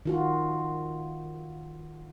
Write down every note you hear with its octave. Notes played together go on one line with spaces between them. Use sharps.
D#3 F4 F#4